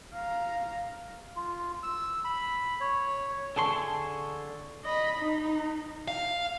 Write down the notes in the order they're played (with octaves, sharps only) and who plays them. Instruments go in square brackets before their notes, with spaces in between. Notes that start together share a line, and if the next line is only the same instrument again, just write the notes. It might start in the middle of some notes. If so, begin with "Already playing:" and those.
[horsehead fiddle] F5 A#5
[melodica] F4
E6
B5
C#5
[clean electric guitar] D3 G#4 C6 [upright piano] A5 C#6
[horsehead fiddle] D#5 B5
D#4
[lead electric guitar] F5